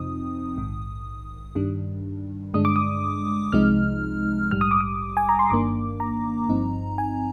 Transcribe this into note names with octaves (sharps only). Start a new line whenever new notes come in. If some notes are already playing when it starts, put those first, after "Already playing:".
Already playing: F2 C3 F3 C4 D#4 D#6
A#1 G#2 D#3
G2 D#3 G3 D4
G2 D3 G#3 D4 D#6
D6
D#6
C2 C3 F3 G#3 D#4 F6
A#1 G#2 G3 F6
D#6
D6
D#6
G#5
A#5
C6
G1 G2 D#3 A#3 D4 D6
A#5
G1 G2 F3 C4 D#4
G#5